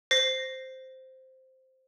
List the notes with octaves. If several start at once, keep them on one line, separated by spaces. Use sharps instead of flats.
C5 A#6 C7